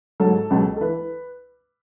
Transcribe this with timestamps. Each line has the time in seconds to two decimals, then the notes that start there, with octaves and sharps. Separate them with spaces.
0.20 G#2 F#3 A4
0.50 C#2 B2 F#3
0.77 A4
0.81 E3 B4